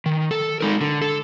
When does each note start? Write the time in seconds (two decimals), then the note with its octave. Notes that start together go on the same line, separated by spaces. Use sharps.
0.06 D#3
0.31 A4
0.61 G#3 D#4 A#4
0.81 D3
1.01 A4